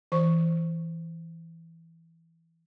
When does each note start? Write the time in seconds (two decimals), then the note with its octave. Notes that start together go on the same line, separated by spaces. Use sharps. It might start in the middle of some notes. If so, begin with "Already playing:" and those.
0.12 E3 C5 C#6